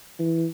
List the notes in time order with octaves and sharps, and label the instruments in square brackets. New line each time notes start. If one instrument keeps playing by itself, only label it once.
[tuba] E3